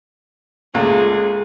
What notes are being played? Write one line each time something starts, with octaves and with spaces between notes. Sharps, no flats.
C#2 A#2 G#3 A3